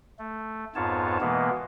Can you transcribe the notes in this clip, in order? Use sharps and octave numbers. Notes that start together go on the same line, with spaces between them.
A3
F2 G#2 B3 F4 C#5 A5
B2 E3 G#3 A#3 B3